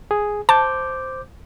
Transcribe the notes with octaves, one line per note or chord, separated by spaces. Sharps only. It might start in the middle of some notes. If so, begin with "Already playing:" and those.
G#4
C5 A5 D6 G6